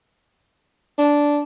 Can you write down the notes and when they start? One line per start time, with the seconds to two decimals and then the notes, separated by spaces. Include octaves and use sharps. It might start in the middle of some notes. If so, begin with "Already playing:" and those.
0.98 D4